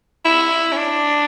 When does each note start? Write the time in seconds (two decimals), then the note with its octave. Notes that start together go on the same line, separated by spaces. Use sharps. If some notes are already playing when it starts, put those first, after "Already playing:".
0.25 E4
0.72 C#4
0.77 D4